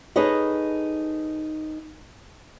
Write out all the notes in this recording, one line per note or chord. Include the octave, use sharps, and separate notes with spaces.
D#4 G#4 A4 B4 C#5 D#5